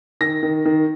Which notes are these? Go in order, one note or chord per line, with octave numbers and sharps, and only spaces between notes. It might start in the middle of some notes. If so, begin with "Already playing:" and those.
D#3 A#6
D#3
D#3